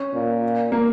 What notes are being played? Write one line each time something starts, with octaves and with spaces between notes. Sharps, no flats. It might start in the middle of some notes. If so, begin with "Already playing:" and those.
Already playing: C#4
A#2
A#3